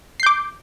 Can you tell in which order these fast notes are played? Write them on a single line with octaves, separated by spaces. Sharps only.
C7 G6 D6